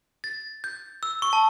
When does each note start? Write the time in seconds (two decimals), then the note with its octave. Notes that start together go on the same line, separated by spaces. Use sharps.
0.24 A6
0.64 G6
1.03 E6
1.22 C#6
1.33 A5